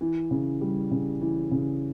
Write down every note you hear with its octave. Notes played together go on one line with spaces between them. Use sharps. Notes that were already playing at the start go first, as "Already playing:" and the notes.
E3
C#3
G3
C#3
E3
C#3